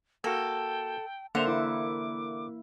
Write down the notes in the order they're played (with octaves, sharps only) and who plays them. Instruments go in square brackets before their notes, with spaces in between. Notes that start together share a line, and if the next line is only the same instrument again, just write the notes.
[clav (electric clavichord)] A#3 F#4 [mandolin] A4 [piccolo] G5
[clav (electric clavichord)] D3 C5 E5 [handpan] A#3 [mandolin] F#5 [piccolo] F7
[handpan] E4 [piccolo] D6